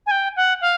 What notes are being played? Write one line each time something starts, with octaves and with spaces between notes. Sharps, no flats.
G#5
G5
F#5
F5